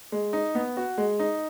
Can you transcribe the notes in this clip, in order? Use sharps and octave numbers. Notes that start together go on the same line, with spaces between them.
G#3
D#4
B3
F#4
G#3
D#4